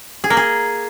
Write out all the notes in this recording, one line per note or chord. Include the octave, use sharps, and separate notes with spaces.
G#4
A#3
G#4